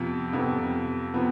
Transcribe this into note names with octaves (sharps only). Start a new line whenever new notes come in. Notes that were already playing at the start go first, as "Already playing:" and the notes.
Already playing: F2 C3 F3 B3
F2 C3 F3 B3
C3 F3 B3